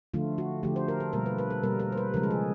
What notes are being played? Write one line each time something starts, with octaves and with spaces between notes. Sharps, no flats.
D3 F3 A3 F4
F#4
D3 F3 A3 G4
C5
A#4
A4
B2 G3 A#3 A#4
B4
B4
A4
B2 G3 A#3 A#4
A#4
C5
B4
C#3 F3 G#3 A#4
A4
G#4